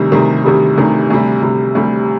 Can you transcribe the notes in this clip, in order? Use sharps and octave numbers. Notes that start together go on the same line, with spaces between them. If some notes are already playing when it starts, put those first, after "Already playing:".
Already playing: D2 C3 D#3 G3
D2 C3 D#3 G3
D2 C3 D#3 G3
D2 C3 D#3 G3
D2 C3 G3
D2 C3 G3
D2 C3 G3